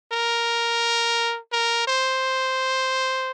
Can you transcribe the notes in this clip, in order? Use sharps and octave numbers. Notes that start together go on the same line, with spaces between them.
A#4
A#4
C5